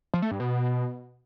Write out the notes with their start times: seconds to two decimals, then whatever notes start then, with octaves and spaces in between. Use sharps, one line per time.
0.14 F3
0.22 A3
0.31 G2
0.40 B2